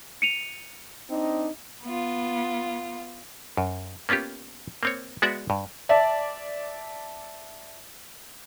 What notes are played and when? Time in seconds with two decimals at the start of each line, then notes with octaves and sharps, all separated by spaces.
0.22 C#7 D#7 F7
1.10 C4 D4 D#4
1.83 B3 F4
3.57 F#2
4.09 A#3 B3 C#4 F4 G4
4.83 A#3 C4 C#5
5.22 G#3 B3 F#4 D5 E5 F#5
5.50 G2
5.89 D5 E5 A5